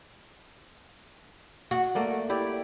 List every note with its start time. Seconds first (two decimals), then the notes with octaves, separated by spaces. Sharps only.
1.71 F#4
1.95 A3 A#3 D5
2.29 E4 G4 D5